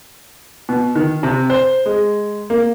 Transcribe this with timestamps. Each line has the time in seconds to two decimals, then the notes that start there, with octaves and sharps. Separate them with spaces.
0.69 B2
0.96 D#3
1.23 C3
1.50 C5
1.86 G#3
2.50 A#3